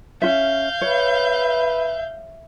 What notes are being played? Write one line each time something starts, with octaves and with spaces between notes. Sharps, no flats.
C#4 F4 E5 F5 G6
B4 C#5 E5